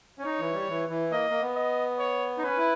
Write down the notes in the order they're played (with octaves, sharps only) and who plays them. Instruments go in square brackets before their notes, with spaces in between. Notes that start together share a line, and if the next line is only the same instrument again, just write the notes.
[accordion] C#4
[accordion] D#4 [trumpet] C#5
[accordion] E3
G3
E3
E3
[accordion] A#3 [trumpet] D#5
[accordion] A#3
B3
[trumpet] D#5
C#5
[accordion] D#4
[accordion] C#4 [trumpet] B4
[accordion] E4